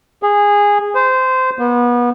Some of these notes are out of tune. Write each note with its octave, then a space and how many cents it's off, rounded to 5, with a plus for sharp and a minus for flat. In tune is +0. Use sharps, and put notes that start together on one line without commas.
G#4 -15
C5 -20
B3 -30